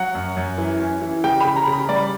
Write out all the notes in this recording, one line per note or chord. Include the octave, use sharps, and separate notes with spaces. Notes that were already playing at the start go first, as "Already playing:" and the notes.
Already playing: F#3 F#5
F#2
F#2
E3
C#4
E3
C#3 G5
C#3 B5
A#5
C#3 B5
G3 D5